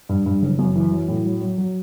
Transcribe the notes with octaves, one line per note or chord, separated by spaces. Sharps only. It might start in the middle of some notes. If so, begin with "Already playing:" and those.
G2
G2
F#1
F#2
E3
F#3
A2
F#3
F#3
F#3